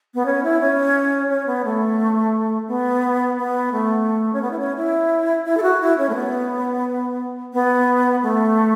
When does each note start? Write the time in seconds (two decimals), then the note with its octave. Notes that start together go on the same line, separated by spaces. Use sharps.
0.15 B3
0.26 C#4
0.44 E4
0.61 C#4
1.29 C#4
1.47 B3
1.65 A3
2.68 B3
3.38 B3
3.72 A3
4.33 C#4
4.42 B3
4.51 E4
4.59 C#4
4.76 E4
5.45 E4
5.57 A4
5.63 F#4
5.81 E4
5.98 C#4
6.09 A3
6.15 B3
7.54 B3
8.23 A3